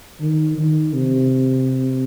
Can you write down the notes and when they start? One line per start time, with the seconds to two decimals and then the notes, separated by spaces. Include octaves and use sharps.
0.21 D#3
0.58 D#3
0.94 C3